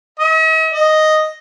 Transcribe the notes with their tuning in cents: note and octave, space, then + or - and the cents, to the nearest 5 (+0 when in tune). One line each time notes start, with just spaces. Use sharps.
D#5 +45
D#5 +0